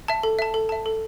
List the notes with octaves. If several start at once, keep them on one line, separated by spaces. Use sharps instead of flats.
E5 A5
A4
E5 A5
A4
E5 A5
A4